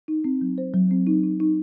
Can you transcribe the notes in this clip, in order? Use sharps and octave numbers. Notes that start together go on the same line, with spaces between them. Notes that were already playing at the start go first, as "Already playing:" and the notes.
D#4
C4
F#3
C5
F#3
C4
D#4
D#4
D#4